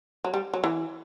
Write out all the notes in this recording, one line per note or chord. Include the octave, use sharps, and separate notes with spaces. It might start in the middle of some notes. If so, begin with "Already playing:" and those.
F#3
G3
F#3
E3